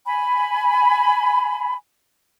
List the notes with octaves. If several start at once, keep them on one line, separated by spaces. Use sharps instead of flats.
G#5 B5